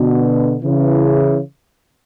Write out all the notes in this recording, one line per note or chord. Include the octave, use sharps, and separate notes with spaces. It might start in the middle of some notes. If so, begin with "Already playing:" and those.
Already playing: B2 D3
C#3 E3